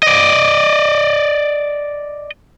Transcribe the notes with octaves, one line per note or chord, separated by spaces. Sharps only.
D5 D#5